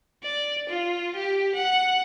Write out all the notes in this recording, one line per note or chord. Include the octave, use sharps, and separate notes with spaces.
D5
F4
G4
F#5